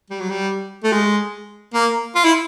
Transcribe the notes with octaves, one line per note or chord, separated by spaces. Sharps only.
G3
F#3
G3
A3
G#3
A#3
F4
E4